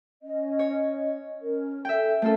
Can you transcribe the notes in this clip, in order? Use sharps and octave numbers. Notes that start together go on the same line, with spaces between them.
C#4 D#5
C#5
C#4 A#4
A4 E5 G5
A3 C#4 F4 A4 A#4